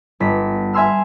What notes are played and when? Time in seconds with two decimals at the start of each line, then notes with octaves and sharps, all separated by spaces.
0.20 G1 B6
0.73 E5 G#5 C6 E6 F6